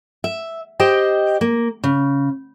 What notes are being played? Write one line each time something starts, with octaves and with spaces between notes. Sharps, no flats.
E5
G4 C5 D#5 G5
A#3
C#3